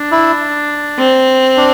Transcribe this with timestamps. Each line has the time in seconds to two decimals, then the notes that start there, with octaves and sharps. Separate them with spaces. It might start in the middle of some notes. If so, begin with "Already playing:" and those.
Already playing: D4
0.11 E4
0.98 C4
1.57 D4